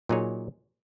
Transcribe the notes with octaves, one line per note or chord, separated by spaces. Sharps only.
A#2 F#3 D#4 G#4 C#5